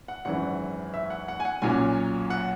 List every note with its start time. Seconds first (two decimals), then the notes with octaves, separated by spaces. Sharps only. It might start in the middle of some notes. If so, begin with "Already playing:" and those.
0.08 F#5
0.25 G#1 F#2 E3 F#5
0.94 E5
1.10 F#5
1.28 F#5
1.40 G#5
1.45 F#5
1.62 B1 A#2 F#3 C#4 G#5
2.30 F#5